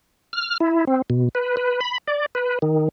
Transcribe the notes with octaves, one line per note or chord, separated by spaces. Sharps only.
F6
E4
C4
B2
B4
B4
B5
D5
B4
D#3